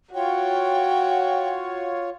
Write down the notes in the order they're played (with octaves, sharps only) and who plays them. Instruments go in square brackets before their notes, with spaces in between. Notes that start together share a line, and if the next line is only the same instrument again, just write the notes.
[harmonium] F4 C#5 [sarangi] F#4 [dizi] G5